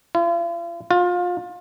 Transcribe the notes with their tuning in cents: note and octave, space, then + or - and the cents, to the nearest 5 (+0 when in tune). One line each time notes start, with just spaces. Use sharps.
F4 -45
F4 +25